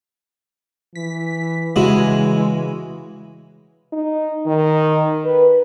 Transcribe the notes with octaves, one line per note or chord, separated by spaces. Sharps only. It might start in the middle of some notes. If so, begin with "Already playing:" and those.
E3 B6
C#3 E3 G#3 E4 F#4
D#4
D#3
B4